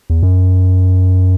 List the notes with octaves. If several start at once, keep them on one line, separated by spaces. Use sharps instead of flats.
E2
F#2